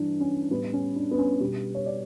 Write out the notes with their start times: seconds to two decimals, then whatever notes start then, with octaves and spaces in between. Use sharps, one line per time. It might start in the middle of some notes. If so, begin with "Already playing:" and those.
Already playing: G2 E3 G3 D4
0.20 C#4
0.50 A2 G3 B3
0.73 C#4
0.96 D4
1.11 B3
1.18 C#4
1.40 B2 G3 G4
1.74 C#5
1.86 D5